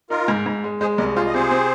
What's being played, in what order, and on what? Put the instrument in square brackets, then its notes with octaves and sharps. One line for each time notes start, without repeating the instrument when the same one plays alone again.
[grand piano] D#4 [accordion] F4 A#4
[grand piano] G#2
G#2
G#3
[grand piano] G#3 [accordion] G#4 C5
[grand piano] C2 [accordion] A#4 D#5
[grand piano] F4 [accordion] G#4 C5
[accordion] D#5
[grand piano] C3 [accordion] G#4 C5
[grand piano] C4